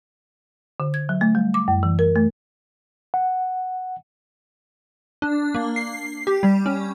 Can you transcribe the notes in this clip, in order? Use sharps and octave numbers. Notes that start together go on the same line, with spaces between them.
D3
G#6
F#3
A3
G3
D6
F#2
E3
A#4
A3
F#5
D4
A#3
C7
G4
G3
C#4